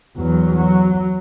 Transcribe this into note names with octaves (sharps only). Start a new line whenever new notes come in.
E2 F#3
F#3